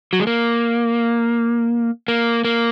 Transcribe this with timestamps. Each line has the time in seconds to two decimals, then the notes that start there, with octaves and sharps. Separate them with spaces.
0.13 F#3
0.20 G#3
0.27 A#3
2.08 A#3
2.45 A#3